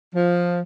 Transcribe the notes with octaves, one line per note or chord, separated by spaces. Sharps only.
F3